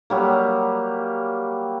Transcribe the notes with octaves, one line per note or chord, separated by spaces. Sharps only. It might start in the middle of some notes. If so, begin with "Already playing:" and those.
F#3 G3 A#3